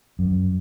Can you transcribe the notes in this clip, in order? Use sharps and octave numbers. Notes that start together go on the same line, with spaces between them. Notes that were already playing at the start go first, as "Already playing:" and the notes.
F#2